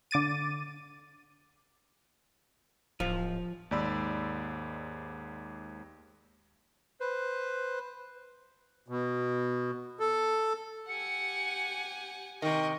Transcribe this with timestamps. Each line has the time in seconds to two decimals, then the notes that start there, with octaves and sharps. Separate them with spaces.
0.11 D3 D6 A6 D#7
3.00 D1 F3
3.71 D#2 G#2 D5 B5 E6
7.00 B4 C5
8.88 B2
10.00 A4
10.89 G4 F#5 G#5 C#7
12.42 C3 D#3 D#5 G5 C#6